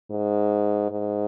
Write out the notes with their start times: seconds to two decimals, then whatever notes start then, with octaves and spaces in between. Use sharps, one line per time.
0.10 G#2
0.90 G#2